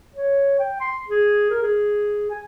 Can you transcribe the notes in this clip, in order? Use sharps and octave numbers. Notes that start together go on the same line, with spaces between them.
C#5
G5
C6
G#4
A#4
G#4
G#5